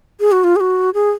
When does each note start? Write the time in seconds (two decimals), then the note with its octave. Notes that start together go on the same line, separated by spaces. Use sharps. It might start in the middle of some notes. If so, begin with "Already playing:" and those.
0.20 G#4
0.32 F#4
0.44 F4
0.56 G#4
0.60 F#4
0.94 G#4